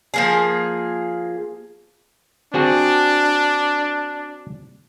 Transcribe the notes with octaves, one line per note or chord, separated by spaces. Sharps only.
F3 A#3 G#4
C4 D4 F#4 G#4